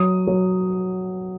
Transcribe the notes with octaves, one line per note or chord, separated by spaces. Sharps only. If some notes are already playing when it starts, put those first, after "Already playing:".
Already playing: F#3 D#6
F#3